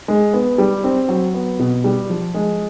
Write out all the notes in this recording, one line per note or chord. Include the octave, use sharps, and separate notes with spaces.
G#3
B3
G3
C4
F#3
B3
B2
G3
F3
G#3